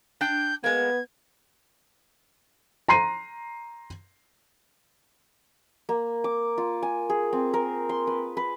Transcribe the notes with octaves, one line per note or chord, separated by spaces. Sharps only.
D4 G5 G6
G#3 A#3 B3 B4 G#6
A#5 C6 C7 D#7
A#3
D6
F4
G#5
G#4
C4
A#4
C6
B4
B4